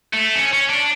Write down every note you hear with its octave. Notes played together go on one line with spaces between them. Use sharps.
A3
C#4
C#4
D4